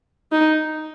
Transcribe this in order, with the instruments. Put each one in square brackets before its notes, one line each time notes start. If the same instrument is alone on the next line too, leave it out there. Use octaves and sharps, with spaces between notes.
[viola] D#4